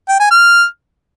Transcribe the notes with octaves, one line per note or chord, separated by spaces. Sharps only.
G5
G#5
F6